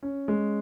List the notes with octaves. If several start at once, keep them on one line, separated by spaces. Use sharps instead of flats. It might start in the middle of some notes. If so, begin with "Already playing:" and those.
C#4
G#3